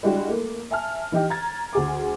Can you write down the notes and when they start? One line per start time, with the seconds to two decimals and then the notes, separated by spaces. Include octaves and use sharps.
0.03 G3 G#3 D4 E4 F#4 G4
0.29 A3 A#3
0.71 E5 G#5 A5 F6
1.12 E3 D#4 G4 D#5
1.30 A#5 G#6 A6
1.73 D2 G#4 D6